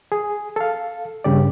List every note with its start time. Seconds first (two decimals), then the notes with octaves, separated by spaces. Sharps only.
0.12 G#4
0.56 A4 F5
1.24 G2 C#3 G4 D5